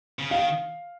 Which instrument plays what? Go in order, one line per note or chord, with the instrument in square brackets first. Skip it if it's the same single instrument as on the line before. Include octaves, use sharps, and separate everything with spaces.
[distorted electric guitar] C#3
[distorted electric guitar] D#3 [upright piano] F5